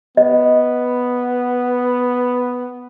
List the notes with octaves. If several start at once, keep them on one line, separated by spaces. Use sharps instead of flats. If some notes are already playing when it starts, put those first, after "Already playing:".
B3 D#5